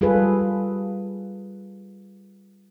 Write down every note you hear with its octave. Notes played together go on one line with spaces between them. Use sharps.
G3 F4 G#4 A4 B4